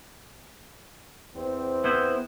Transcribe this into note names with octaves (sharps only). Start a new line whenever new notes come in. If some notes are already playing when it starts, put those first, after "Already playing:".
E2 C4
B3 E4 C5